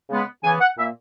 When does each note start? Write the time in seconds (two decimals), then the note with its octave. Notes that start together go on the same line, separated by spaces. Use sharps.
0.10 C#3 G#3 B3
0.43 C#3 E3 B3 G#5
0.61 F#5
0.78 A#2 A#3 E5